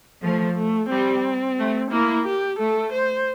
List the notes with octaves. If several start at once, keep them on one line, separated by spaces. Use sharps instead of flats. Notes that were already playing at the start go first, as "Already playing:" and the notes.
F3 A3
A3
G3 C4
A3
A#3 E4
G4
A3 A4
C5